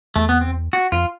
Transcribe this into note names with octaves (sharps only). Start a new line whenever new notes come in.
E2 A3
B3
C4
F#4
F2 F4